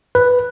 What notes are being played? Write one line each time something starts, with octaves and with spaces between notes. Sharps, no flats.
B4